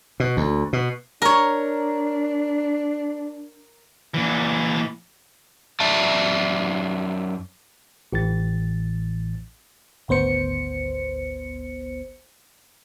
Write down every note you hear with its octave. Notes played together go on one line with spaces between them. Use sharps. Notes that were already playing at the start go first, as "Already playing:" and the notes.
B2
D2
B2
D4 A#4 C#5
A#2 E3
F#2 D5 E5 A5
A1 A2 E3 A6
G#1 D2 B3 C5 C#7